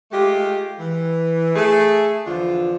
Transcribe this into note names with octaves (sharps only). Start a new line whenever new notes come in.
G#3 A3 F4 G4
E3
A3 G#4
E2 D3 F3 F4